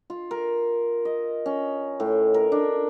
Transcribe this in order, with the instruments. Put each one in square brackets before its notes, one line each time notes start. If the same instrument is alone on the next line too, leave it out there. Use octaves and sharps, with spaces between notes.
[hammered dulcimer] F4
A#4
D#5
C#4
A2
A#4
D4